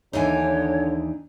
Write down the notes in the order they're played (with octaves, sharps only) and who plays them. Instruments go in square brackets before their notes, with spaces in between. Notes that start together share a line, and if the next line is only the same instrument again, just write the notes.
[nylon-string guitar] D#2 E3 G#5 [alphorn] D3 [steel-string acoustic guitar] D4 D#4 [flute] C#5